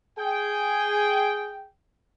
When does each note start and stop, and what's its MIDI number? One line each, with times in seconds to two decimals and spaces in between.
0.19 1.69 68
0.19 1.69 79